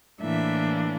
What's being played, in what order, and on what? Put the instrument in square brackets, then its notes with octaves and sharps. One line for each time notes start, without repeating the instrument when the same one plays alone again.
[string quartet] A2 E3 A#3 D4 E5